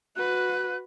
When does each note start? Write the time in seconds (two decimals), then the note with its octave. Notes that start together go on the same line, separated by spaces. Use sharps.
0.16 F#4 B4 F#6